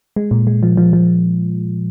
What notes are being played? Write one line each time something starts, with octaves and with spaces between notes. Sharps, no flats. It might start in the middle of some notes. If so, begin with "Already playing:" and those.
G#3
A#2
G#3
F3
F3
F3